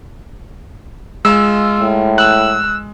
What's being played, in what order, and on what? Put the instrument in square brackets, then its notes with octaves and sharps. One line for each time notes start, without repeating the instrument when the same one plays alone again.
[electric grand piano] G#3 [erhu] F4 [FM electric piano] E6
[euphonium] A2
[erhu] E6 [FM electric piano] F#6